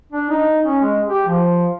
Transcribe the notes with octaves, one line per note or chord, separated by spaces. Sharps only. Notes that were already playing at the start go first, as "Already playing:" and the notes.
D4
D#4
C#4
G#3
G4
F3